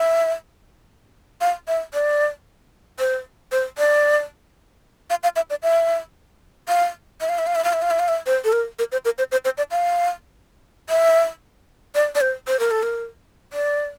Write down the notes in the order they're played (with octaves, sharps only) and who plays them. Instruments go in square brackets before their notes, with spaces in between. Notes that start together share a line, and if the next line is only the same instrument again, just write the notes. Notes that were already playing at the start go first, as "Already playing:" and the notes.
Already playing: [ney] E5
F5
E5
D5
C5
C5
D5
F5
F5
E5
D5
E5
F5
E5
F5
E5
F5
E5
F5
E5
F5
E5
F5
E5
C5
A4
A#4
A#4
C5
A#4
C5
C5
C5
D5
F5
E5
D5
D5
C5
C5
A#4
A4
A#4
D5